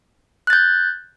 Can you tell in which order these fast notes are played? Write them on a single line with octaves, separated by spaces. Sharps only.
F#6 A6 G6